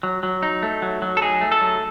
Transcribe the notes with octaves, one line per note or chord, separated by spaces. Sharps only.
F#3
F#3
D#4
A3
F#3
F#3
A4
D#4 G#4
A3
A4
F#3